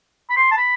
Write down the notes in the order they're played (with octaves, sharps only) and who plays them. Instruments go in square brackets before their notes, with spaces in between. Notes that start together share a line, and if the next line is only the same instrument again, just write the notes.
[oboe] B5
C6
A5
B5